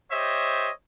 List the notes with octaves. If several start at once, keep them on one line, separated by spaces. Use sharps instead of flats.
G4 C5 C#5 D#5 E5